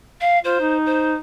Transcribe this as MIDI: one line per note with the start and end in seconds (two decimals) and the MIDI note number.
0.20 0.38 77
0.44 0.60 65
0.44 0.77 72
0.60 1.17 63
0.85 1.14 72